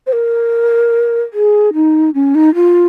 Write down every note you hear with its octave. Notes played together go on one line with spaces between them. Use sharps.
C5
A#4
G#4
D#4
C#4
D#4
F4